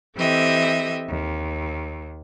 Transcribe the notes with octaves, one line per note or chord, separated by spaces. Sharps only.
E3 C4 G4 A4 D#5 E5
D#2